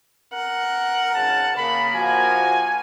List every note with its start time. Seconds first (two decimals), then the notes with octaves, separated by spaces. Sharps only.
0.33 A#4 F#5
1.15 G#1 C#3 A5
1.56 C#3 A#3 A#4 B5
1.95 A#1 F3 F#4 G#5